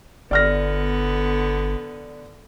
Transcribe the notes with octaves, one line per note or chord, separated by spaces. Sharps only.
G1 D3 B3 D5 F6 A#6